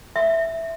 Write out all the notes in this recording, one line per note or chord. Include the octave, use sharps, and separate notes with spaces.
E5